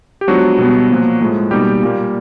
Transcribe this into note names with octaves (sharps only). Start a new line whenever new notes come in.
G4
F3 F#3 G#3 B3 D4 F#4
B2 G3 B3
A#2 F3 A#3
A2 F3 G#3
B2 G3 A#3 D#4 G4
A#2 G3 A#3